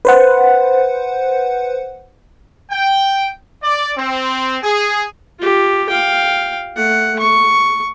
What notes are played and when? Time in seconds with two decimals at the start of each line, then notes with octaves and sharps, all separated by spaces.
0.05 B4 C5 F#5
2.70 G5
3.62 D5
3.96 C4
4.63 G#4
5.39 F4 G4
5.89 F5 G5
6.76 A3 F#5
7.19 C#6